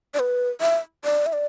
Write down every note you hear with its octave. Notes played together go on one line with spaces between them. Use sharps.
D5
B4
E5
D5
E5
D5